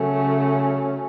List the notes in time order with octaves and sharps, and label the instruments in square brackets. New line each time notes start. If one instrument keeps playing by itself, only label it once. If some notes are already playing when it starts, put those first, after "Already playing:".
Already playing: [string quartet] C#3 F#3 A3 C#4